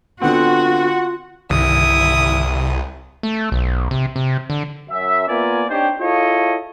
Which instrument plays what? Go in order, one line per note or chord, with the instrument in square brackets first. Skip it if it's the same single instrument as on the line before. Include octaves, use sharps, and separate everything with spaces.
[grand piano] D3 B3 C4 [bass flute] F4 [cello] F#4 [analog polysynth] F#5
[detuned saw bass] C2 [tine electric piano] G2 D3 D#3 [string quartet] E4 D#6
[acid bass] A3
B1
C3
C3
D3
[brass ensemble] F#2 E5
A#3 B3 F4 A#4 D5 G#5
C4 D4 D#4 G4 C5 C#5
E4 F4 G#4 A4 C#5 D#5